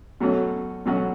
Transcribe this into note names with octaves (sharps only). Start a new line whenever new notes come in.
B2 F#3 A3 C#4 F#4
B2 F#3 A3 C#4 F#4